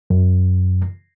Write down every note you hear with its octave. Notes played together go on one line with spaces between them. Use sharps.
F#2